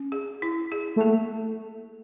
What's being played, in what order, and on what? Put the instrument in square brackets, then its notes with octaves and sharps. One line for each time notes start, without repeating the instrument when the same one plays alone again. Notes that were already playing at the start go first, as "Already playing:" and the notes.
Already playing: [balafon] C#4
G#4
E4
G#4
[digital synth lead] A3 [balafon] A#3